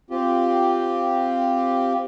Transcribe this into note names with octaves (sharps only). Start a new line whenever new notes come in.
C4 F4 G4